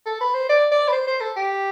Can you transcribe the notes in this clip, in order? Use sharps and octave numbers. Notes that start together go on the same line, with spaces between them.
A4
B4
C5
D5
D5
B4
C5
C5
A4
G4